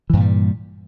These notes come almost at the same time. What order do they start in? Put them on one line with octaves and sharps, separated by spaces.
E3 G2 A#2 G3